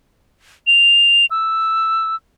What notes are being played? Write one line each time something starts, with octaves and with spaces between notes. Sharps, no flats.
F7
E6